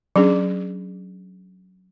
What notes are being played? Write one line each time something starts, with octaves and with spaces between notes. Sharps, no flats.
F#3 C#4 D4 G#4